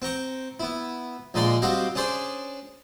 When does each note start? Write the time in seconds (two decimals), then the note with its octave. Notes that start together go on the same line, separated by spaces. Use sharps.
0.02 C4 G5 A#5 C#6
0.60 B3 E4
1.34 A#1 D3 G#3 D#4 D5 C6
1.62 G3 C4 F#4 G4 D#5 F5
1.95 C#4 D4 G#4 C5 D5